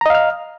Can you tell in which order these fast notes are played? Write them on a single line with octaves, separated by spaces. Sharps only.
A#5 D#5 F5 F6